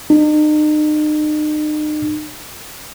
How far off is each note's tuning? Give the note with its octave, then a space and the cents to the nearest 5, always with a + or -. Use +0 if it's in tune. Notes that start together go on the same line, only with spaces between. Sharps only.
D#4 -40